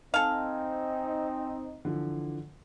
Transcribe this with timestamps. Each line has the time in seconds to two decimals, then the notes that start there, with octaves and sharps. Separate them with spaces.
0.14 C4 D#4 A4 F5 G5 G#5
1.85 D3 E3 F3